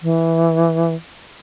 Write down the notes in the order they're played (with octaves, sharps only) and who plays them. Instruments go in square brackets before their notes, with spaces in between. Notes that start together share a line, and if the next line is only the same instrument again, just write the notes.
[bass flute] E3